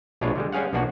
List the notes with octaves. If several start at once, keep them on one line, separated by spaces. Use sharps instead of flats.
A#1 B2 G#3 D4 F4 C#5
D3 G3 G#3
G3 C#4 G#4 F5 F#5
B1 F3 A#3 D4 F#4 F#5